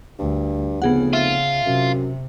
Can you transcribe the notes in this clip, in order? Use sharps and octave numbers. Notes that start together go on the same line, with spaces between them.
D2 G2
F1 C#3 B3 G#4 F#5
F4 E5
F#2 C3